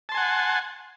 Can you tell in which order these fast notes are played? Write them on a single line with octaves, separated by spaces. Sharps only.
A5 C6 G#5 F#5